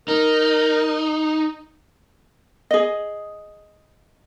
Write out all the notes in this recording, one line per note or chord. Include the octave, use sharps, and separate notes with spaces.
D#4 A#4
G#4 D#5